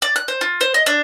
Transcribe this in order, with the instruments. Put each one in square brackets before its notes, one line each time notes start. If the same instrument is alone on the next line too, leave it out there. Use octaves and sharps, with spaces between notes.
[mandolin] D5
F#6
C5
F4
C5
D#5
D4